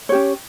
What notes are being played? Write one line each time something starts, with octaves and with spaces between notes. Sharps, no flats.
C#4 G4 C#5